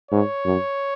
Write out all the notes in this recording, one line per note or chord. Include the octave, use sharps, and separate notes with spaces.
G#2 C#5
F#2